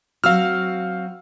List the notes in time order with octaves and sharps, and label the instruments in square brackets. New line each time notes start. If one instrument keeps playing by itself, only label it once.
[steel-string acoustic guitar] F#3 C4 F#4 [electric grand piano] F5 E6 F6